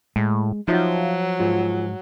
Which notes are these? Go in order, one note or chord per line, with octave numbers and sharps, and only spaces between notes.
A2 G#3
F3 F#3 D#4 F4 E5
G#2 F4 G#4 C5